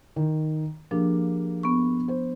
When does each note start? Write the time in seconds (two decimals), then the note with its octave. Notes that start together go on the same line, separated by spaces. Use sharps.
0.16 D#3
0.91 F3 A#3 D4 G4 G#4
1.63 B3 C#6
2.08 C5